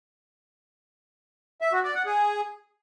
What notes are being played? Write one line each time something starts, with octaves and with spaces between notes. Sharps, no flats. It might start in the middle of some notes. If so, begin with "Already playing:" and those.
E5
F#4
D5
F#5
G#4